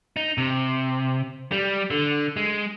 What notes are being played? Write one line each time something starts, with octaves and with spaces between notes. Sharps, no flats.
D#4
C3
G3
D3
G#3